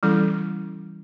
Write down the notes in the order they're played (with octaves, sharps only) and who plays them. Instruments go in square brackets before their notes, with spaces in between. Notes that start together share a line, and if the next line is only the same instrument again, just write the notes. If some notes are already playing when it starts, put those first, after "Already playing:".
[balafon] E3 G3 C#4 E4 A4